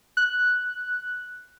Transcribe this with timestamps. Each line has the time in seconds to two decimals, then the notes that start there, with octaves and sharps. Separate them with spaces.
0.17 F#6